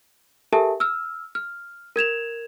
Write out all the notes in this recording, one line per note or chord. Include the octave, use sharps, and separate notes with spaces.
G4 A4 A#4 E5 G#5 A5
E6 F6
F6
A#4 G#6 E7 F7